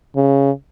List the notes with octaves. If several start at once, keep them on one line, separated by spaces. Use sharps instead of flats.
C#3